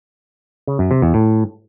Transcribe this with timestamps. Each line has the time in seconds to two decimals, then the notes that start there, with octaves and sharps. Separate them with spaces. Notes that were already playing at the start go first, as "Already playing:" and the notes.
0.67 C#3
0.79 F#2
0.91 C3
1.02 E2
1.14 A2